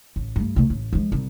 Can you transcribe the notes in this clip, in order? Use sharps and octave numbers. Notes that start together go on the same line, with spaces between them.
A1
G2 A3
C3 A3
A1
F3 G#3
C2